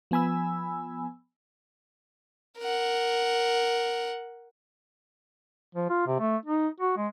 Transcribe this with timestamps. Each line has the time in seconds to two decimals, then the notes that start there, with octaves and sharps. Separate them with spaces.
0.11 F3 B3 G#5 B5 E6
2.59 A#4 F#5
5.75 F3
5.90 F4
6.07 C3
6.20 A3
6.46 D#4
6.81 F#4
6.97 G#3